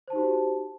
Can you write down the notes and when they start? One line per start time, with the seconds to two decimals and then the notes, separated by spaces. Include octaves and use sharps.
0.08 C5
0.10 A5
0.13 D#4
0.16 G4
0.18 F#4